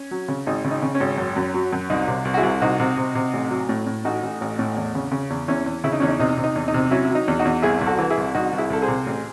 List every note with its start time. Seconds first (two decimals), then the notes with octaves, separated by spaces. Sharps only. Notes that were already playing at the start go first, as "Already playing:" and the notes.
Already playing: C#4
0.11 F#3
0.28 C#3
0.47 G#1 D#4
0.65 C#3
0.71 D#4
0.82 C#3
0.95 C#4
1.00 G#1
1.18 F#2
1.36 F#2
1.54 F#3
1.73 F#2
1.90 C2 D#4
2.08 C3
2.25 C2
2.34 F#4
2.37 E4 G#4
2.43 C2
2.61 C3 D#4 F#4
2.80 C3
2.97 C3
3.15 C3
3.33 A1
3.51 F#3
3.69 A2
3.86 A2
4.04 A1 D#4 F#4
4.23 A1
4.41 A1
4.59 A2
4.76 E2
4.95 C#3
5.12 C#3
5.30 E2
5.48 E2 C#4 E4
5.66 E2
5.84 C#3 E4
5.92 D#4
6.00 E2 C#4
6.08 D#4
6.19 C3 D#4
6.37 C3
6.44 D#4
6.56 E2
6.68 D#4
6.74 C3
6.91 F#3 C#4 E4
7.05 E4
7.10 F#3
7.15 D#4
7.28 E2
7.39 D#4 F#4
7.45 E2
7.62 C2 E4 G#4
7.81 C2
7.86 F#4 A4
7.99 E3
8.10 E4 G#4
8.17 C2
8.35 C2 D#4 F#4
8.53 C2
8.58 E4 G#4
8.70 C2 A4
8.82 G#4 C5
8.88 C3
9.07 A1